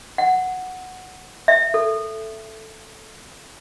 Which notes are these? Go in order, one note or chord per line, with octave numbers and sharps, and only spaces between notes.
F#5
E5
A4